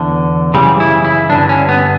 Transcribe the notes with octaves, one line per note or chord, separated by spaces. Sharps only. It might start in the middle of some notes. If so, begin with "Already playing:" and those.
Already playing: E2 D3
F#2 C#3 E3 G3
E4
E4
G2 D3 D4
C#4
B3